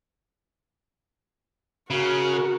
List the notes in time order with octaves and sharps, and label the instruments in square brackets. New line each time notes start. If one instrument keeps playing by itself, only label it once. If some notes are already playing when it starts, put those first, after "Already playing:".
[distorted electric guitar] C#3 [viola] F#4 A#4